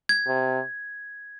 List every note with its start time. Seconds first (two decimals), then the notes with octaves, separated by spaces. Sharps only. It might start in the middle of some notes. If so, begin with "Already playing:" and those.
0.09 G#6
0.27 C3